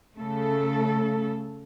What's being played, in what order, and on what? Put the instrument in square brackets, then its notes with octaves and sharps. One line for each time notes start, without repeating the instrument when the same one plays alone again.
[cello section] C#3 A3 A4